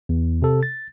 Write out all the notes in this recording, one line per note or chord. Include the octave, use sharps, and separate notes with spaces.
E2
C3 A4
A6